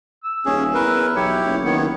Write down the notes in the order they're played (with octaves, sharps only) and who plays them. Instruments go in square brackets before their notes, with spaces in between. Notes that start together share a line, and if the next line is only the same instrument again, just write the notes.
[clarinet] E6
[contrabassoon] D#1 [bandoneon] C#4 G#4
[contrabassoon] E2 [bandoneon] A#4 B4
[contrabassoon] B1 [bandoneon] E4 G4 [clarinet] C#5
[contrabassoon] F#1
[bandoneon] D#3 B3